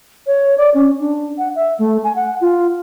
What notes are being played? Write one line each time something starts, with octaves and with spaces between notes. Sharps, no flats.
C#5
D5
C#4
D4
F#5
E5
A3
G#5
F#5
F4